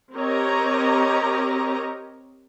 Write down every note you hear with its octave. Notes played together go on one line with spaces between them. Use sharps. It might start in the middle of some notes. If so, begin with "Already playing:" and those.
C4 G4 A#4 C#5 D#5 A#5